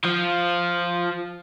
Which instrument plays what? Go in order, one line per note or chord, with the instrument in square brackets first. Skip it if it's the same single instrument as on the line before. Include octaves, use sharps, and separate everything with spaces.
[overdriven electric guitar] F3 F4